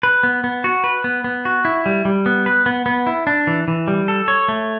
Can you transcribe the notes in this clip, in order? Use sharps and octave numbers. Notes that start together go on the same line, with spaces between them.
B4
B3
B3
F#4
B4
B3
B3
F#4
E4
G3
G3
B3
B4
B3
B3
E4
D4
E3
E3
G3
A4
C#5
A3